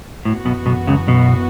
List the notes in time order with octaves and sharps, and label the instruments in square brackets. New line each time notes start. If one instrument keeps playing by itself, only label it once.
[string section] F#2 E3 B3 F#4 [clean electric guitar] A2
[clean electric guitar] B1 B2
B1 B2
C#2 C#3
B1 B2